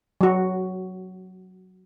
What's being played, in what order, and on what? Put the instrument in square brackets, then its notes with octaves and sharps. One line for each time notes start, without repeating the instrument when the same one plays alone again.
[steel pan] F#3 F#4